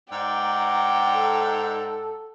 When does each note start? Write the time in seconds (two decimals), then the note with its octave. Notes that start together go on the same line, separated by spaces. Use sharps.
0.12 G#2 D5 F#5 G5 A#5
1.15 A4